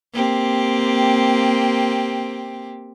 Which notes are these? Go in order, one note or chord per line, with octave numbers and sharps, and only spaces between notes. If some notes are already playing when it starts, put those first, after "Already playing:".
A#3 C4 G4